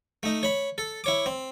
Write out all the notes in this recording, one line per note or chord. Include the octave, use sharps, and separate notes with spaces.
A3 D#4
C#5 B5
A4
E4 C#5 D6
C4